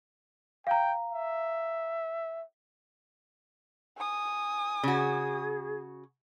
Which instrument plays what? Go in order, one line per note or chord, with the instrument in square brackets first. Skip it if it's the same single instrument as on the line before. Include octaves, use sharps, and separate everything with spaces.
[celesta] F5 A#5 [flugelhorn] G5
[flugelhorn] E5
[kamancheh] G#5 D#6
[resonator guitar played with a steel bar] C#3 F#4 [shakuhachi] G#4